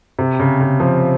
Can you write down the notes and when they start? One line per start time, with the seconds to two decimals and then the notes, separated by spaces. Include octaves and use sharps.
0.19 C3
0.40 C#3
0.61 C#3
0.80 F3